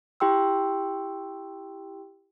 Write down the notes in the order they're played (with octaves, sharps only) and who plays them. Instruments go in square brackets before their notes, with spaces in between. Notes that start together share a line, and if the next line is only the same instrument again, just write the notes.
[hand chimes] E4 G4 G5 C6 E6